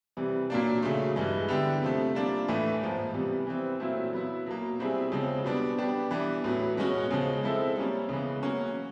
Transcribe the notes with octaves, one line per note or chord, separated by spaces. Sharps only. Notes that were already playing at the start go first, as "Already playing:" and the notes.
C3 E3 G3
A#2 F#3 A#3 D4
C#3 F#3 A3
G2 E3 G#3
D3 G3 B3 E4 G4
C3 F3 A3
G3 A#3 D4 F4
A2 E3 A3
G#2 F3 A#3
C3 E3 G3 B3
E3 G3 C4
A#2 F#3 A3 C4 E4
F#3 B3 E4
B2 F#3 A#3
B2 G3 C4 E4 G#4
C#3 F3 G#3 C4
B2 G3 B3 D4
G3 B3 D4 G4
E3 G3 B3 D4
A2 F#3 B3
B2 G#3 C#4 F#4
C#3 F3 G#3
F3 G#3 C4 E4 A4
G3 A#3 C#4
C#3 E3 G#3 B3
F#3 A#3 C#4 F#4